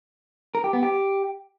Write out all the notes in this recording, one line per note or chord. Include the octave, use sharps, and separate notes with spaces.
A#4
G4
B3
G4